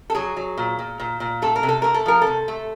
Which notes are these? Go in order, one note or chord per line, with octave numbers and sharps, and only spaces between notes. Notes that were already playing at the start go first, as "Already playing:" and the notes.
A4
F#3 G#4
F#3
A#2
A#2
A#2
A#2
A3 A4
A#4
C3
A4
A3 A#4
A4
F3 A#4
A4
C3
A3